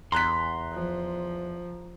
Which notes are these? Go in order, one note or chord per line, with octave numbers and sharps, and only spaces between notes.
E2 A#5 C6 F#6 B6
F3